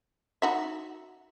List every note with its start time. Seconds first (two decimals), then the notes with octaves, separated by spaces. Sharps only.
0.42 D#4 F#4 E5